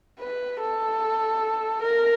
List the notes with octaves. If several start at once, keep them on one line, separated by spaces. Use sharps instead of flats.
B4
A4
A#4